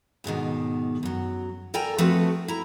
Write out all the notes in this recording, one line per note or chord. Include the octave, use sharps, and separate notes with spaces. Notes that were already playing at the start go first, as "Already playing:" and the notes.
D2 G#2 B2 D#3
F#2 F#3
A4 A#4 D5 G5 G#5 A#5
F3 A3 C4 F#4 A4 B4
E4 A#5